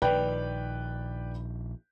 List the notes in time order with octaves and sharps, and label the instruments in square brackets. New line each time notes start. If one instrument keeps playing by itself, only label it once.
[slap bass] A#1 D#3 [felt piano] B4 D5 G5